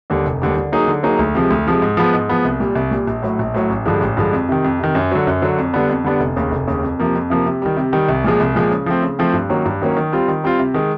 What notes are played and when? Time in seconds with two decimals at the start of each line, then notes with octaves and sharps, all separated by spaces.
0.10 D#2 D3 G3
0.26 F1
0.42 D#2 D3 G3
0.57 D3
0.72 F#3 A#3 D#4 G#4
0.88 D3
1.03 F#3 A#3 D#4 G#4
1.19 D2
1.35 C3 F3 G#3
1.50 D2
1.66 C3 F3 G#3
1.82 G#2
1.97 F3 G#3 B3
2.13 G#2
2.29 F3 G#3 B3
2.45 C2
2.60 A#2 G3
2.75 C2
2.91 A#2 G3
3.07 A#1
3.22 A2 F#3
3.39 A#1
3.54 A2 F#3
3.70 A1
3.86 G2 D3 F3 G#3
4.01 A1
4.17 G2 D3 F3 G#3
4.33 F2
4.49 C3 D#3
4.64 F2
4.79 C3 D#3
4.95 F#2
5.12 D3 F#3
5.27 F#2
5.42 D3 F#3
5.58 F2
5.73 D3 G3 B3 D4
5.89 F2
6.04 D3 G3 B3 D4
6.20 F1
6.37 D#2 C#3
6.51 F1
6.68 D#2 C#3
6.83 F2
6.99 C3 F3 A#3
7.15 F2
7.30 C3 F3 A#3
7.46 C3
7.62 D#3 G3
7.77 C3
7.93 D#3 G3
8.09 C2
8.24 A#2 F3 G#3
8.40 C2
8.55 A#2 F3 G#3
8.72 C#3
8.86 F3 A3 C4
9.03 C#3
9.19 F3 A3 C4
9.33 G2
9.50 D#3 F#3 A#3 C#4
9.65 G2
9.82 D#3 F#3 A#3 C#4
9.97 D#3
10.12 G3 C4 F4
10.28 D#3
10.44 G3 C4 F4
10.59 C3
10.74 D#3 G#3